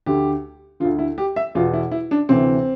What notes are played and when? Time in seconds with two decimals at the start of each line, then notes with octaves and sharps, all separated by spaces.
0.06 D2 D3 G4
0.80 D3 F4
0.85 D2
0.99 E4
1.18 G4
1.36 E5
1.55 E2 B2 F4
1.73 E4
1.92 E4
2.11 D4
2.29 D2 C3 E3 C4